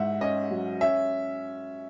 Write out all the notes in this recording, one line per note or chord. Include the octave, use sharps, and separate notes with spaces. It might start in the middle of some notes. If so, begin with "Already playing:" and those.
Already playing: G#2 E4 E5 F#5
C#4 D#5
F#3
C#4 E5